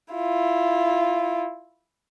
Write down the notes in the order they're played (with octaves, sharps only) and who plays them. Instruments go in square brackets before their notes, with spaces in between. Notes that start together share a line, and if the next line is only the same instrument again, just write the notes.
[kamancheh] E4 F4